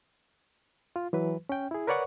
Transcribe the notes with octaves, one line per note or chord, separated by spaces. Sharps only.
F4
E3 F#3 B4
C#4 G5
E4 G#4
A#4 B4 C#5 D5 F#5 C#6